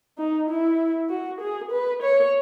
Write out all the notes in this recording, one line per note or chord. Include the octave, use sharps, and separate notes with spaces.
D#4
E4
F#4
G#4
B4
C#5